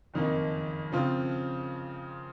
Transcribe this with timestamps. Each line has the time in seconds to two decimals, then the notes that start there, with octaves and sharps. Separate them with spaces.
0.14 F#1 F2 D#3 A#3 D#4
0.92 C#3 F3 C4 F4